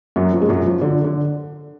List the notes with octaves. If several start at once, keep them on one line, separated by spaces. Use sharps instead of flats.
F#2 F#3
F3
G#3
F#2 F#3
F3
D3
D3